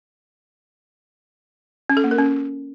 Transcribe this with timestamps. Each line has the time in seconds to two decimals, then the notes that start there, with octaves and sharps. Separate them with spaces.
1.90 C#4
1.97 A4
2.04 A#3
2.11 A#4
2.18 C#4